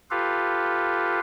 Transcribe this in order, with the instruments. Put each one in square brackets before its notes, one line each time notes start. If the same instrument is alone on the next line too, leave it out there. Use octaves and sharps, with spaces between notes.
[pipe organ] F4 G4 A4 B4 F5